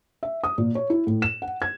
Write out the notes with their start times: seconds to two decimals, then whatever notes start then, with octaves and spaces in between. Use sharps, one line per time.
0.23 E5
0.44 D#6
0.58 A#2
0.75 C#5
0.90 E4
1.07 A2
1.22 E7
1.42 F#5
1.62 G#6